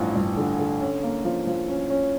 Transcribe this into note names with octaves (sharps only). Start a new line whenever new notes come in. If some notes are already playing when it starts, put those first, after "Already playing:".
Already playing: A1 G2 F3
G2
D3
D3
C#4
A#3
F3
F3
C#4
C#4